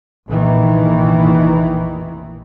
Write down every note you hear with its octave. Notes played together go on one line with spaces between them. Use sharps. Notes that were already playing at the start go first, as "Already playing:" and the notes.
F1 A#1 A#2 D#3 E3